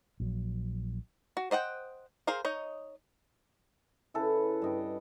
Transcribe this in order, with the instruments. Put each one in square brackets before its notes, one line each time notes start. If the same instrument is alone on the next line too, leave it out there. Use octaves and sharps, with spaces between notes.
[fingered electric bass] A#1 F#3
[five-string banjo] F#4
C5 D#5 F#5 G5
G#4 A#4 C5 F5
D#4 C#5 D#5
[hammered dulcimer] C#3 E4 A4 B4
G2 D#5 G5